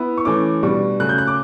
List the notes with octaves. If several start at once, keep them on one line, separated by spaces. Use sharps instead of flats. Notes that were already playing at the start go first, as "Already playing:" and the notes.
Already playing: B3 E4
C#6
E3 A3 C#4 D6
B2 G3 D4 C#6
C#3 F#3 A3 F#6
G6
F#6
D6